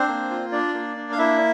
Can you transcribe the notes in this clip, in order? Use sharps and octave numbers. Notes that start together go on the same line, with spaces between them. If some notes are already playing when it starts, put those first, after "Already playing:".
Already playing: C4 D4 C5
A#3
F4
D4 D5
A#3
D4
F5
A#3 E4 E5